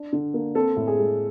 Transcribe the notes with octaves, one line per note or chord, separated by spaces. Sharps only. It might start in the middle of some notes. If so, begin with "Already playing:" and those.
Already playing: D4
D3
A#3
C4 A4
A2
G#4
G#3